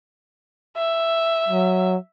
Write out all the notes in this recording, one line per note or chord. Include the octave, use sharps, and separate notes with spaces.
E5
F#3